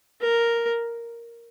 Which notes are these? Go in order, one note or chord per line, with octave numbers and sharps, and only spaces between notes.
A#4